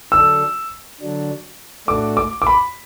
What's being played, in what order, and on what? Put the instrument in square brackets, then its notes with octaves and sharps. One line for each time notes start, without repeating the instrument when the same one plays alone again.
[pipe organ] D3 F#3 D4 A4 [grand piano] E6
[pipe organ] D3 F#3 D4
[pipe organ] A2 A3 D4 F#4 [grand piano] D6
[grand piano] D6
D6
B5